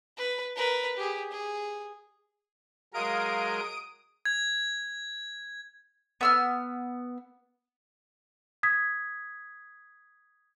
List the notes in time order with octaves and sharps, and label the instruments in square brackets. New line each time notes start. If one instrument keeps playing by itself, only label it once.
[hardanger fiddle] B4
A#4 B4
G4 G#4
G#4
[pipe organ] F#3 G#3 A#4 [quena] F5 [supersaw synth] D#6 D7
[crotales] G#6
[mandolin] B3 E6 F6
[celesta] D#6 G#6 B6